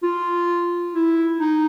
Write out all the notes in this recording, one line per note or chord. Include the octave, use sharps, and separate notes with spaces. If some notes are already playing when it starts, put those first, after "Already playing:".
F4
E4
D#4